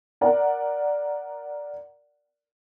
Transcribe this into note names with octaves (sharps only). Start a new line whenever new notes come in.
A#4 D5 F#5